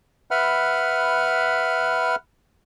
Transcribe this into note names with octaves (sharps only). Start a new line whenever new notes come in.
B4 E5 F#5 B5 F6